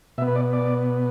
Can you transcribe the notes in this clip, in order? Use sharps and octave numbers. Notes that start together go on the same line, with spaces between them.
B2 B3 E5
B4
D5
D5